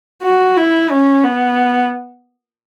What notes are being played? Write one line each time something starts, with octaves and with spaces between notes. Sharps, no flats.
F#4
E4
C#4
B3